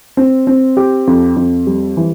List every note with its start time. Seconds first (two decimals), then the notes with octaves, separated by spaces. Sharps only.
0.17 C4
0.47 C4
0.77 G4
1.07 F2
1.36 F2
1.67 G3
1.97 E3